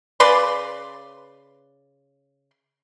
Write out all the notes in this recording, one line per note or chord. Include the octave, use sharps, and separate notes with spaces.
C#3 B4 D5 C6